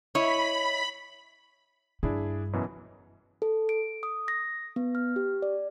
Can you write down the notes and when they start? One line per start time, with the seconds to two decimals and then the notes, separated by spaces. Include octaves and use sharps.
0.15 E4 C#5 D#5 B5
2.03 G2 D4 E4 G#4
2.53 F#2 B2 E3
3.42 A4
3.69 D7
4.03 D#6
4.28 A#6
4.76 B3
4.95 F6
5.16 G4
5.42 D5